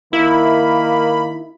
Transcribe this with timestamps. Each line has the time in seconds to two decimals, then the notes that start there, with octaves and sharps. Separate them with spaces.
0.13 D#3 A#3 E4 B5